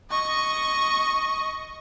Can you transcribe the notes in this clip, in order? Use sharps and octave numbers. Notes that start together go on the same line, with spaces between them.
D#5 C#6